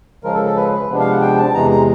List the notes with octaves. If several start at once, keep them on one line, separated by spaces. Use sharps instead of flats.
C#3 F3 G#3 A#4
A4
A4
B4
B4
C3 F3 G#3 B3 D4
F5
F#5
G5
A5
E2 C3 E3 G#3 A#5
A#5